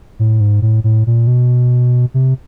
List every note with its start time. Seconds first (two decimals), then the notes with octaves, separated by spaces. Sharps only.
0.19 A2
0.40 G#2
0.62 A2
0.84 A2
1.07 A#2
1.27 B2
2.14 C3